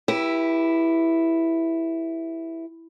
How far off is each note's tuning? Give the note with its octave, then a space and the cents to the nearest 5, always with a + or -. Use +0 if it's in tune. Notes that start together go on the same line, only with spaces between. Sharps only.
E4 +0 G4 +15 B4 -35